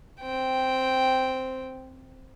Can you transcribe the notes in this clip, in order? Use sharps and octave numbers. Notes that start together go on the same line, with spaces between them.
C4 G5